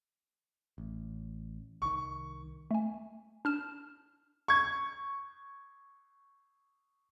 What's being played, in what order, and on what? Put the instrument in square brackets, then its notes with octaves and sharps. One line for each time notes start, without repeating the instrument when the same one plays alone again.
[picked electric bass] A1
[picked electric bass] C2 D#3 [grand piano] C#6
[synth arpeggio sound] A3 G#5
D4 F6 E7
[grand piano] C#6 G#6